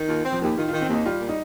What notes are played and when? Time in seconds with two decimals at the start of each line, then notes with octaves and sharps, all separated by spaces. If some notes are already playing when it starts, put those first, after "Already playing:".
Already playing: D#3
0.09 D#2 F4
0.25 C4
0.32 F3
0.41 D#2 G4
0.57 D#3 F4
0.68 D#3 F4
0.81 C4
0.88 D#2
0.94 D#4
1.06 G3 F4
1.20 A#2
1.29 D#4